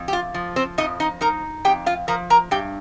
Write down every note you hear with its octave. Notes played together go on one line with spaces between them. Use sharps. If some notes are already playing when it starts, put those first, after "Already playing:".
Already playing: F2
G4
F4
F3
C4 C5
F2 D#4 D#5
D#4 D#5
D#4 A#4 A#5
F2 G4 G5
F4 F5
F3 A#4 A#5
A#4 A#5
G2 G4 G5